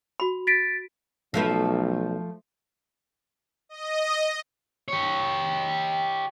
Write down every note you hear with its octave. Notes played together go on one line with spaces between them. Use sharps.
F#4 B5
A6 B6 D7
B1 F3 A3 B4
D#5
G4 C#5